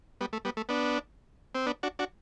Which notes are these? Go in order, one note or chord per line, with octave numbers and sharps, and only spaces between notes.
G3 B3
A3
G3 B3
A3
B3 D4
C4
B3 D4
D4 F#4
D4 F#4